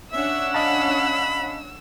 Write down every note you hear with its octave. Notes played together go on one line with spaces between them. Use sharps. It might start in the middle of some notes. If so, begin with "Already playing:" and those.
C#4 D4 E5 F#5 E6
D#5 F5 A5 B5